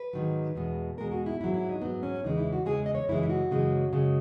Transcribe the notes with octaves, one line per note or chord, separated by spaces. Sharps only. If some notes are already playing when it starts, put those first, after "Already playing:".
Already playing: B4
G#2 D#3 F#3
E2 B2 G#3
E2 B2 G#3 A#4
F#4
E4
G#2 F#3 E4
E4
D#4
G#2 F#3 B3
C#4
E2 C#3 E3 G#3 D#4
E4
F#4
E2 C#3 E3 G#3 G#4
D#5
C#5
F#2 C#3 E3 G#3 E4
E4
F#4
F#2 C#3 E3 G#3
F#2 C#3 G#3